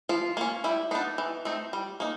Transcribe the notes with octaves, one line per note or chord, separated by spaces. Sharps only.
F3 F4
A#3 C#4
G3 E4
B3 D4 D#4
E3
A3 C4 D#4
G3
A#3 D#4